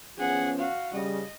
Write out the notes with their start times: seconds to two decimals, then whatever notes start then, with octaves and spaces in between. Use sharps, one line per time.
0.18 F3 B3 C#4 G#4 F#5
0.59 F#4 F5
0.94 C#3 G3 D#5